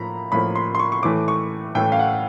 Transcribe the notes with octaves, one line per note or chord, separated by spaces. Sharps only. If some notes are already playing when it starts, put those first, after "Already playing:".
Already playing: A2 F3 A#3 A#5 B5
A2 F3 A#3 B5
C6
C6
C#6
C#6
A2 E3 A3 D6
C#6
A2 E3 A3 G5
F5
F#5